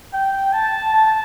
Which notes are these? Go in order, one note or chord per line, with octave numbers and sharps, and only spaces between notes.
G5
A5
A5